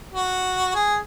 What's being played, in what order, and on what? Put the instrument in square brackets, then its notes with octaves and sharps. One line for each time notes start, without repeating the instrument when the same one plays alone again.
[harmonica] F#4
G#4